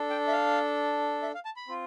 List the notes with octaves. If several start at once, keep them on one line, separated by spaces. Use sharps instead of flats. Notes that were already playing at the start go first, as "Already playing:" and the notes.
Already playing: D4 A4
G5
E5
F5
E5
F5
A5
B5
C4 F4